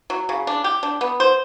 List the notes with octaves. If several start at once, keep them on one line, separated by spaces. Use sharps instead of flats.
F#3
C#3
D4
G4
D4
B3
C5